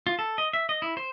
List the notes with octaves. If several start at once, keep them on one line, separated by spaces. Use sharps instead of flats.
F4
A4
D#5
E5
D#5
E4
C5